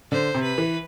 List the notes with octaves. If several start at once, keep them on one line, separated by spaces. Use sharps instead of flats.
D3 C5
C3
B4
E3